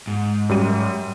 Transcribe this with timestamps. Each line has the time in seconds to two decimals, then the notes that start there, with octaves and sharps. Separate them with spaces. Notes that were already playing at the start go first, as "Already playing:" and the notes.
0.07 G#2
0.49 F#2 G3 D#7